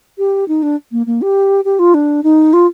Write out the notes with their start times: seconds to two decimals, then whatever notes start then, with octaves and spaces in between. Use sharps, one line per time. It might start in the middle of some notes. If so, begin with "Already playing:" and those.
0.18 G4
0.48 D#4
0.63 D4
0.92 A#3
1.06 A#3
1.22 G4
1.65 G4
1.79 F4
1.94 D4
2.23 D#4
2.53 F4